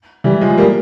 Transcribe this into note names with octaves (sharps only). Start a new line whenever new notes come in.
E3 G3
F3 G#3
G3 A#3